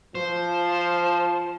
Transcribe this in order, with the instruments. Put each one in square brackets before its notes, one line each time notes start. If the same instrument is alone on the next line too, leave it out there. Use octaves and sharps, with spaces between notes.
[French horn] F3 [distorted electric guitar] C5